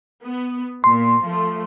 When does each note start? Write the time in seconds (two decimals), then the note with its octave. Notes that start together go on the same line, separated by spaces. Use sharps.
0.23 B3
0.84 A#2 C6
1.22 F3 A3